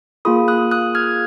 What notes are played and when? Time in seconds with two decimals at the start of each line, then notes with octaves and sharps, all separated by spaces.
0.25 A#3 F4 G#4 B5 D#6
0.48 D#6 F#6
0.71 D#6 F#6
0.95 F6 G#6